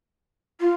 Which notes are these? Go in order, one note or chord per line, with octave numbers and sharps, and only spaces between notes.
F4